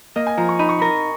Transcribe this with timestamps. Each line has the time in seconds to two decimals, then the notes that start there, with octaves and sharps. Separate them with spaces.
0.16 A#3 D#5
0.27 G#5
0.38 F3 A#5
0.49 C#6
0.59 D#4 B5
0.69 C#6
0.79 A#4 B5